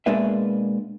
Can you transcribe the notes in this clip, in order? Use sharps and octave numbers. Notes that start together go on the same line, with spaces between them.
B2 G#3 A#3 D4 B4 E5